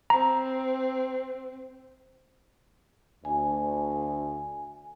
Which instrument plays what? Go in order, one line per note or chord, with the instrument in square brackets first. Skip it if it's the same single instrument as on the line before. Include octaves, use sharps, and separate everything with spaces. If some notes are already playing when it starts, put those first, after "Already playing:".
[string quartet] C4 [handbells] A#5
[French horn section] D2 [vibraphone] G#5